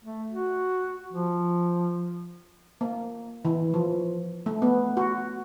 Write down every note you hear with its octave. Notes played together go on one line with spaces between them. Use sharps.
A3
F#4
F3
A#3
E3
F3
A3
B3
F#4